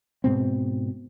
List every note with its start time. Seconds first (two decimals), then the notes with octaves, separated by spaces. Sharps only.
0.24 G#2 B2 C4